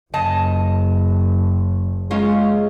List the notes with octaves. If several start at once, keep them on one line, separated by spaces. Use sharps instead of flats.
F#1 C#3 D#5 A5
G#3 A#3 C#4 F4